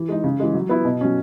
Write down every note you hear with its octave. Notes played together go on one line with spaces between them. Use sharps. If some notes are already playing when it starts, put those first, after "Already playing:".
Already playing: E3
G#3 D#4
C#3
E3 G#3
F#3
B3 E4
B2
F#3 C#4